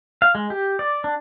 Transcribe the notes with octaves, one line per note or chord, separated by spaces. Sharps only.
F5
G#3
G4
D5
D4